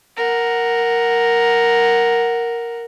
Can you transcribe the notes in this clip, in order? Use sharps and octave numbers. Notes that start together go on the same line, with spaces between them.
A#4 F#5